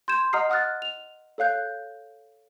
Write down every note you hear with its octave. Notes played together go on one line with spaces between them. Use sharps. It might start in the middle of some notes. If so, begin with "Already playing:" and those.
C6 G6 G#6 E7
D#5 F#5 A#5 D#6 F6 C7
F#5 D#6 F6 F#6 A6
F7
A4 C#5 F5 F#6 G6